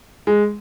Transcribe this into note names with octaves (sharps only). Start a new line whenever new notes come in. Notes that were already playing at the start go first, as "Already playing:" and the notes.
G#3